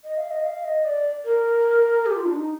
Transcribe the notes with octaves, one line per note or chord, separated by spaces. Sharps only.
D#5
F5
D#5
F5
D#5
D5
A#4
G4
F4
D4
D#4